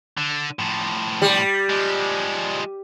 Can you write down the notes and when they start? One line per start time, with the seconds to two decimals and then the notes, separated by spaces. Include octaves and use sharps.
0.18 D3
0.59 A2 F3
1.22 G3
1.69 F3 G#3